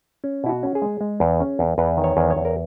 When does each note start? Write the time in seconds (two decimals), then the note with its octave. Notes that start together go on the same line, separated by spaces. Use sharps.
0.24 C#4
0.44 B2 E4
0.49 F#4
0.63 C#4
0.75 G#4
0.82 G#3
1.01 G#3
1.20 E2
1.40 C#4
1.59 E2
1.78 E2 B4
1.97 D#3
2.04 C#5
2.17 E2
2.30 C#5
2.36 E2
2.45 A#4